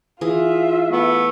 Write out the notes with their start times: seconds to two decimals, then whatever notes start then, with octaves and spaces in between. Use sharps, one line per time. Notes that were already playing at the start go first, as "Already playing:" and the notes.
0.21 E3 F4 G#4 E5
0.91 A3 B3